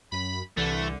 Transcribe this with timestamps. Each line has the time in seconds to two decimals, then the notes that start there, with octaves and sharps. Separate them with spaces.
0.12 F#2 B5
0.57 C2 D3 E3 A3